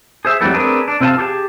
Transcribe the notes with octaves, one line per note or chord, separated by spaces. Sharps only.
G#4 C5 E5
F2 E3 F#3 G3 A3 B3
A3 C4 D4 G#4 A#4 B4
D4
C3 C4 F4 B4 F5 A5
G4 G#4 F#5 A5